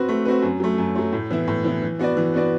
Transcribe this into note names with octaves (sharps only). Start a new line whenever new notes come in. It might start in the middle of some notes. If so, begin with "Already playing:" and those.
Already playing: C4 F#4 B4
A3
C4 F#4 B4
F#2
F#3 A3
F#2
F#3 A3
A2
E3 B3 E4
A2
E3 B3 E4
E3
B3 F#4 B4 D5
E3
B3 F#4 B4 D5